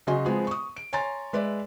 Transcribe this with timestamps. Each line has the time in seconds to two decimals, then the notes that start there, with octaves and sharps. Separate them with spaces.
0.07 C#3 F#3 F#4 D#5 G#5 C6
0.26 F3 G#3 B3 C4 G#4
0.47 C#6 D#6
0.76 D7
0.93 C#5 G#5 A#5 C6 A6
1.33 G#3 B4 D5 E5